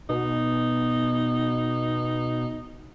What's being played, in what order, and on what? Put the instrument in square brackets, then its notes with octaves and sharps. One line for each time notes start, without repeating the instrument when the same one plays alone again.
[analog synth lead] B2 [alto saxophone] D#4